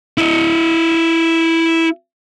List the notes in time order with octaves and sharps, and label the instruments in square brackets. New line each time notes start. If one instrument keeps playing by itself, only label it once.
[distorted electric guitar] E4 D#5